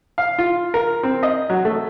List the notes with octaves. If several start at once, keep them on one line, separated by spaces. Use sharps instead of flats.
F5
F4
A#4
C4
D#5
F#3
A3